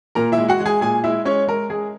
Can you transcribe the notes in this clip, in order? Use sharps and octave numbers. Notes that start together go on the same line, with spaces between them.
A#2 A#4 A#5
E4 E5
G#3
F#4 F#5
G#3
G#4 G#5
A#2 G#4 G#5
G#3 E4 E5
G#3 C#4 C#5
G#3 A#4
G#3 G#4